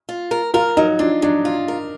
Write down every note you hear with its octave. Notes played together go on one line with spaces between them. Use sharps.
F4
A#4
F4 A#4
F#3 D#4
D4 F4
F#3 D4
F4
A#4